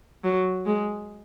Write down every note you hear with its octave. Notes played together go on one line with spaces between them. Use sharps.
F#3
G#3